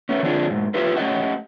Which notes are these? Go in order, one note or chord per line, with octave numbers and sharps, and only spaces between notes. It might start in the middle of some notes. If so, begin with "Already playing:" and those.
A3 B3 C#4
D3 C4 D4 F4 G#4
G#2 B2
E4 F4 G4 A4 B4
A3 C#4 G4 D#5 F#5